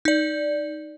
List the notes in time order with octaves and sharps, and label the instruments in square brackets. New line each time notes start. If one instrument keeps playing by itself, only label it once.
[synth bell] D#4 D5